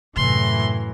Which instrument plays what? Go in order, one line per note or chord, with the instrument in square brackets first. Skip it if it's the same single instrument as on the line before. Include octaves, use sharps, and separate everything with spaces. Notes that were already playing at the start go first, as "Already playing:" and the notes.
[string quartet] F#2 A2 E3 [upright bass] C3 [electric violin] C6